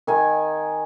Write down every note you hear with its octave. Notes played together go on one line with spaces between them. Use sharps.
D#3 G#5